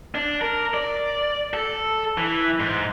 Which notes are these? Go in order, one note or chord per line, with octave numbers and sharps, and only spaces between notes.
D4
A#4
D5
A4
E3
G#2